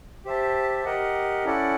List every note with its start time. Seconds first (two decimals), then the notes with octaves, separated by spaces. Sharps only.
0.25 G4 C5 E5 A5
0.85 G4 A#4 D#5 F#5
1.45 C#4 E4 A4 D5 F#5